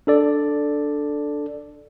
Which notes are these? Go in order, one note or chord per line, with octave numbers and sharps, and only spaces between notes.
D4 A4 D5